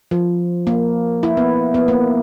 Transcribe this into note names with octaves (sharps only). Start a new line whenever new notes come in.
F3
A#3
E4
B3
B3
A#3